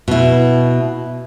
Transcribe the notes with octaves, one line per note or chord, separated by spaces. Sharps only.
B2 E4